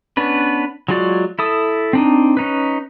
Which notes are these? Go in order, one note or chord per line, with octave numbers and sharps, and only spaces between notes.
B3 C#4 D4 B4
F#3 G#3 F4 F#4 D5
E4 A4 D#6
C4 D4 D#4
C#4 D#4 B4